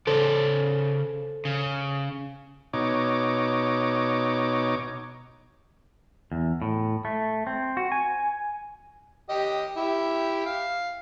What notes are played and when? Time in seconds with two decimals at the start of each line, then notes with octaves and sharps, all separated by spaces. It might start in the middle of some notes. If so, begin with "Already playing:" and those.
0.07 C#3 A4 C5 D5
1.45 C#3
2.73 B2 D#4 C#5 D6
6.32 E2
6.62 A2
7.05 A3
7.47 C4
7.77 F#4
7.92 G#5
9.30 G4 D#5
9.77 E4 G4
10.46 F5